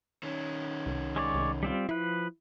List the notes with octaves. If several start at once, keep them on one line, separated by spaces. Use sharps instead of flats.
D#3 C#4
C2
G#3 C#5 D5
C2
G3 C4 F4
F3 E4 B4